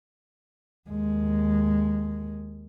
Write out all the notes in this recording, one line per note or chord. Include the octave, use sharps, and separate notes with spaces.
D#2 G#3